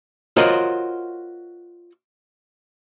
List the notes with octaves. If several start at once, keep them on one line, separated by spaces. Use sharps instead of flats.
F4 F#4 A#4 C5 C#5 D#5